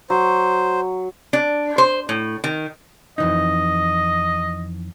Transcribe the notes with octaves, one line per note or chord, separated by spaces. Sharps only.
F#3 C5
D4
C5
A2
D#3
F2 E3 D#4 D#5